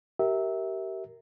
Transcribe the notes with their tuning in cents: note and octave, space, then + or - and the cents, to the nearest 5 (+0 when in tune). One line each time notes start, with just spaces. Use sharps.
G4 -30 A#4 -5 E5 -20